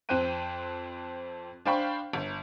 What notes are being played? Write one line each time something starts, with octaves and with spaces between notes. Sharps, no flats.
F2 C4 C5 G5 F#6 D#7
D4 C5 F5 G5 B5 C#6
G1